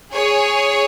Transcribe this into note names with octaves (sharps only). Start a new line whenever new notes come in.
G#4 C#5